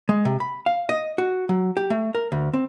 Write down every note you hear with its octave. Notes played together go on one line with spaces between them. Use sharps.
G#3
C3
B5
F5
D#5
F#4
F#3
G4
A3
A#4
D2
C4